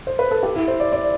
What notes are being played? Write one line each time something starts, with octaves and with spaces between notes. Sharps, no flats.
C5
B4
A4
G4
E4
C5
D5
D5